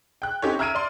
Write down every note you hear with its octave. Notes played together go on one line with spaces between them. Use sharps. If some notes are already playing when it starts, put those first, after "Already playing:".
G5 F#6
C4 C#4 D#4 G4 A4 C#5
E5 A#5 F6 G#6 D7 D#7
D5 C6